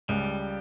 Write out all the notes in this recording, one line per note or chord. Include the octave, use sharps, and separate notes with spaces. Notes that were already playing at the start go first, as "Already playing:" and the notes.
C#2 G3